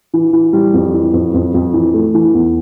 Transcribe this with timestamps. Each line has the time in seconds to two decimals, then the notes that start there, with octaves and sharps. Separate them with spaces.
0.14 E3
0.33 E3
0.53 G3
0.74 F2
0.94 E3
1.14 F2
1.34 F2
1.54 F2
1.73 E3
1.94 A3
2.14 E3
2.34 E2